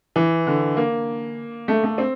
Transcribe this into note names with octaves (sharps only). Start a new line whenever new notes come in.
E3
D3
A#3
A3
A3
C4